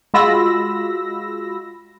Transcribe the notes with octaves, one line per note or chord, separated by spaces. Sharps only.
G#3 F4 F#4 B5 E6 A#6